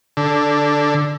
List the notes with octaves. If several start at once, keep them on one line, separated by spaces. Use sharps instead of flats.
D3